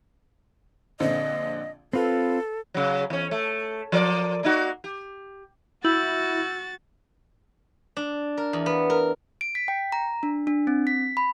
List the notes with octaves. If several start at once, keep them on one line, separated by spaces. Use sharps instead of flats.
A#1 D3 C4 D#5
C4 F4 A4 B4
C#3 F#3
E2 C#4
A3
F3 A#4 D5
A#3 D#4 F#4
G4
E4 F#4 E6 G6 A6 F#7
D4
A#4
E2
B3
A#4
D7
B6
G5
A#5
D4
D4
C4
B6
B5